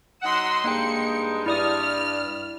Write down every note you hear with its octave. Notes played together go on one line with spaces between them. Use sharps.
F#3 D#4 F#5 C6 E6
G2 G#3 A#3 D#4 G5 C#7
G2 E4 D5 D#6 F6